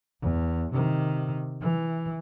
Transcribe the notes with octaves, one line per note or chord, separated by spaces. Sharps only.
E2
C3 D#3
E3